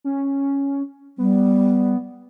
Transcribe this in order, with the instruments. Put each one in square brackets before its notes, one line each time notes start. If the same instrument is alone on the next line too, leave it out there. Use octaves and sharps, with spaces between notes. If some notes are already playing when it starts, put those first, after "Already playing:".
[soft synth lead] C#4
[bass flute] G3 [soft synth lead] B3